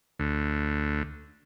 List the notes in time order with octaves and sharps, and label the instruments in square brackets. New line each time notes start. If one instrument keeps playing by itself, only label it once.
[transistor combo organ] D2